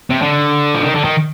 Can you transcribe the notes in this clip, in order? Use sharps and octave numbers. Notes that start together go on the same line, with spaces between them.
C3
D3
F3
D#3
D3
D#3